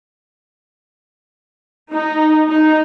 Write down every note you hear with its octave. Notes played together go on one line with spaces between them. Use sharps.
D#4
D#4